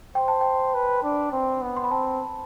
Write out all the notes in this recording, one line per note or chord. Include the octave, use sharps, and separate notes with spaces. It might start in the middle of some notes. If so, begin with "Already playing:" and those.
C5 G5
A5
G5
B4
D4
C4
B3
C6
B5
C4 A5